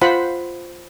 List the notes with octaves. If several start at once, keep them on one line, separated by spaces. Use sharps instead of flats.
F4 C5 F#5 B5